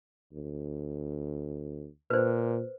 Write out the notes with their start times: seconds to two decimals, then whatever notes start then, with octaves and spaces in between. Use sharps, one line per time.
0.33 D2
2.10 A#2 B4 C5